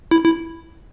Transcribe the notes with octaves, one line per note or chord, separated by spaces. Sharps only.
E4
E4